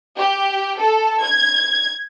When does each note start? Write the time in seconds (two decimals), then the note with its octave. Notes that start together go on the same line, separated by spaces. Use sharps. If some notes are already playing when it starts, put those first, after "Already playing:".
0.17 G4
0.79 A4
1.22 G#6